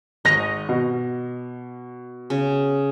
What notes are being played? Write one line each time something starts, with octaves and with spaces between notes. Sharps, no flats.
G#1 D#5 C#6 A#6 F7
B2
C#3